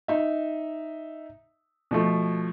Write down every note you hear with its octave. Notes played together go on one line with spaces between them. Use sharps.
D#4 E5
B2 F3 A3